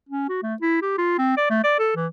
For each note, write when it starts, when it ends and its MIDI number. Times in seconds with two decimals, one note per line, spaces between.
0.09 0.28 61
0.29 0.38 66
0.43 0.55 57
0.61 0.79 64
0.82 0.97 67
0.98 1.16 65
1.18 1.36 60
1.37 1.47 74
1.50 1.63 57
1.64 1.75 74
1.79 1.92 69
1.96 2.07 52